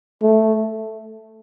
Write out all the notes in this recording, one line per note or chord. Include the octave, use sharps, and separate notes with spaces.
A3